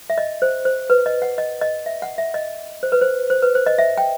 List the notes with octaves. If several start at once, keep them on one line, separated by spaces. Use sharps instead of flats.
E5
D#5
C5
C5
B4
D#5
F#5
D#5
D#5
E5
F#5
E5
D#5
C5
B4
C5
C5
B4
C5
D#5
E5
G5